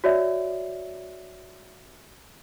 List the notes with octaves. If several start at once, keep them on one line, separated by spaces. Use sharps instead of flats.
F#4 C#5 D5 E5